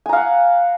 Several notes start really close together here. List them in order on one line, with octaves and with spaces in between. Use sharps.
G#5 A#5 F5 F#5